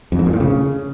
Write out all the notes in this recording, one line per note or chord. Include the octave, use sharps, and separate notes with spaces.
F2
G#2
A#2
A2
C#3